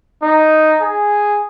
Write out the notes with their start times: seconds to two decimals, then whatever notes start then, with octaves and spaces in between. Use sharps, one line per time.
0.23 D#4
0.82 G#4